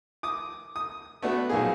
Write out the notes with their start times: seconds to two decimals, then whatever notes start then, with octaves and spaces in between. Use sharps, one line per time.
0.23 D6 D#6
0.76 D#6
1.22 A3 B3 D4 F#4
1.49 B1 F2 A#3 D#4 G#4